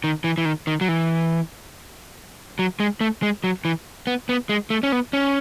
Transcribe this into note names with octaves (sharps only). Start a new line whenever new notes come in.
D#3
E3
E3
D#3
D#3
F#3
E3
F#3
G#3
A3
G#3
F#3
E3
B3
B3
G#3
A3
C#4
B3
C#4